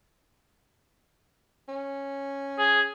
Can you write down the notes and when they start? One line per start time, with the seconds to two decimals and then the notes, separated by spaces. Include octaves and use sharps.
1.69 C#4
2.58 G#4